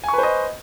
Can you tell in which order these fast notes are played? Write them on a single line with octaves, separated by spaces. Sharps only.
G#5 C#6 B4 C5 D#5